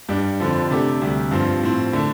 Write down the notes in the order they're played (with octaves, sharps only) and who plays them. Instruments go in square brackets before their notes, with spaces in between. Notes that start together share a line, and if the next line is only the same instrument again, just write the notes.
[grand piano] G2 G3 D4
F2 D3 F3
C3 A3 D4 G4
D2 C3 G3
G2 F3 C4
A2 F3 C4
D3 A3